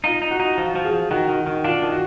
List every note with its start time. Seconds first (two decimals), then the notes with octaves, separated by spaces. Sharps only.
0.04 D#4 F4
0.22 D#4
0.31 F#4
0.40 D#4
0.57 F3 F#4
0.75 F3
0.85 G#4
0.93 F3
1.11 D#3 F#4
1.29 D#3
1.38 F#4
1.47 D#3
1.64 D4 F4
1.82 D#3
1.92 F#4